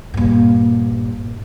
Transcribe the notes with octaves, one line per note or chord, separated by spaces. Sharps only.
G2 A#2